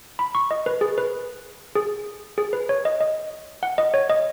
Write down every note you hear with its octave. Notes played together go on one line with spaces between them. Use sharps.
B5
C#6
D#5
B4
G#4
B4
G#4
G#4
B4
C#5
D#5
D#5
F#5
D#5
C#5
D#5